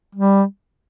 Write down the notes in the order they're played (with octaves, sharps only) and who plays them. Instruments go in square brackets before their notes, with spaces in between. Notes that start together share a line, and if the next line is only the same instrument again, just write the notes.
[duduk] G3